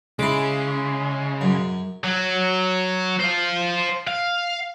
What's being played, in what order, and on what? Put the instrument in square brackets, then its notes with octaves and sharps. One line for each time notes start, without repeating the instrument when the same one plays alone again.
[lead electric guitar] C#3 [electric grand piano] G#3 [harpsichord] E4 D6
[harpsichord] F#2
[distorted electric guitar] F#3
C5 F5
F5